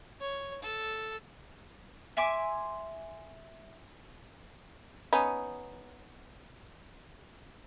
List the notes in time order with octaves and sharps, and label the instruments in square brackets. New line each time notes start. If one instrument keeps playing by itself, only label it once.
[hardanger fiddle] C#5
A4
[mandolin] E5 G#5 C6 D6
[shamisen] B3 C#4 D#4